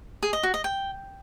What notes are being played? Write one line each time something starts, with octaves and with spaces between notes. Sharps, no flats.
G#4
D#5
F#4
D#5
G5